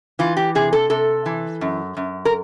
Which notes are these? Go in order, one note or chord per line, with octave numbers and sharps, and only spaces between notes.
E3 F4
G4
C3 G#4
A4
C3 A4
E3
F#2
F#2
A#4